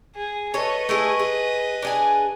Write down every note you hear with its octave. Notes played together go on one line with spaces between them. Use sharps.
G#4
A4 B4 C#5 D#5
A3 E4 G#4
G#4
D4 G#4 G#5